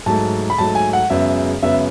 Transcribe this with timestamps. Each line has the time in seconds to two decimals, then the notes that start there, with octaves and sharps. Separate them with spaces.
0.06 G#2 F#3 A3 A5
0.50 B5
0.58 G#2 F#3 A3 A5
0.75 G#5
0.93 F#5
1.10 F#2 C#3 G#3 B3 E5
1.63 F#2 C#3 G#3 B3 E5